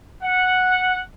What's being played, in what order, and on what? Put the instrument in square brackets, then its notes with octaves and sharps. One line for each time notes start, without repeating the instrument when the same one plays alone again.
[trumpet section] F#5